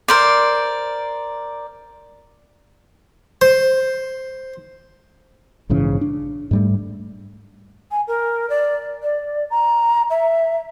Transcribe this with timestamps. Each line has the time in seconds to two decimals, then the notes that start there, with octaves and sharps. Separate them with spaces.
0.08 A#4 C5 D5
3.41 C5
5.69 A#1 G#2 C#3 E3
6.01 D4
6.51 G#2 G3 A3
7.91 G#5
8.08 A#4
8.50 D5
9.03 D5
9.50 A#5
10.10 E5